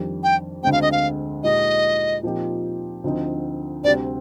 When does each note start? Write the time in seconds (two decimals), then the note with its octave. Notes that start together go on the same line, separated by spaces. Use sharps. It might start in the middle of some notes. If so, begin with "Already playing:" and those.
Already playing: F2 D#3 G3 D4
0.23 G5
0.63 D2 D3 G#3 C4 G5
0.72 F5
0.82 D#5
0.92 F5
1.43 A#2 G#3 D#4 G4 D#5
2.23 A#2 F3 C4 D#4 G4
3.04 D2 D3 F3 C4 D#4
3.84 D2 C3 G3 C4 D5